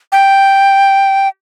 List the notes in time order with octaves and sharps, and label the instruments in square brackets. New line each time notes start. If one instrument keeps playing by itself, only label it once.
[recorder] G5